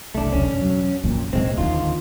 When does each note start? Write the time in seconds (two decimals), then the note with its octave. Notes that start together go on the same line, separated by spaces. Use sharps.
0.15 F#1 C2 A3 D4
0.33 E2 B2 C#4
0.61 F#3
1.04 F2 A#2 A#3
1.33 E1 C#2 A2 G#3 C4
1.58 D#2 D3 D#3 C#4 E4 F4